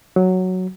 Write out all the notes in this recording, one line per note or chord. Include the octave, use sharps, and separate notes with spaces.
F#3